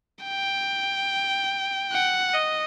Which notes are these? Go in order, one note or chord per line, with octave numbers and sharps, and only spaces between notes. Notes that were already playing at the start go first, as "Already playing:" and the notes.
G5
F#5
D#5